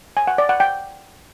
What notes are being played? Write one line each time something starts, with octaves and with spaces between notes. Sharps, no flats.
G#5
F#5
D5
F#5
G5